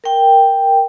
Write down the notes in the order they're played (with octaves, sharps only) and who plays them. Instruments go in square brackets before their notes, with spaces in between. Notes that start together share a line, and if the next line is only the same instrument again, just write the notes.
[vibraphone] A#4 G5